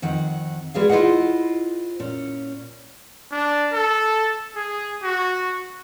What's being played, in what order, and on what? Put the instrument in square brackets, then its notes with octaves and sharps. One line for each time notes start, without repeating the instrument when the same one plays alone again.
[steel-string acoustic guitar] F2 D#3 F#5
G3 G#3 F#4 G#4 B4 F5
E4 F4 G#4 C5 D#5 F#5
A#2 C#4
[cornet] D4
A4
G#4
F#4